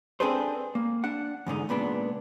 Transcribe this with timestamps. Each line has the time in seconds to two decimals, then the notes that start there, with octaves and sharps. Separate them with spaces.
0.20 C4 D4 G#4 A4 B4 C5
0.75 A#3
1.04 D4 F#5
1.46 E2 G#2 D3 D#4
1.69 C#2 A#2 B3 D4